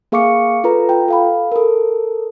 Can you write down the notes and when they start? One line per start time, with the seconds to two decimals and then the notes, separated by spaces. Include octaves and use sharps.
0.12 A#3 G#4 F5 C#6 D6 C#7
0.64 F4 A4 B4 A#5
0.89 F4 G5
1.08 A4 F5 B5
1.52 A4 A#4